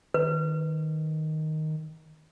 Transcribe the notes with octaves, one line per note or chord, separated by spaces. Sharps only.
D#3 B4